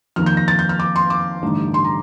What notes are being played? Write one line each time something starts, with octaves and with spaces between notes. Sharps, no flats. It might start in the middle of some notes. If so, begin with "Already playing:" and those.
F2 D#3 A#3 D#4 F6
G6
A#6
A6
G6
F6
D6
C6
D6
A1 G2 D3 A3 D#4
C6
A#5